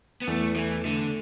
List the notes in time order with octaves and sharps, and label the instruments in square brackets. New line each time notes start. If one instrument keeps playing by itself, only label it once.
[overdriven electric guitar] B3
[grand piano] E2 [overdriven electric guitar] A3
[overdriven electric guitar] E3 [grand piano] A3
[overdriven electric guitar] D3 [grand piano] A3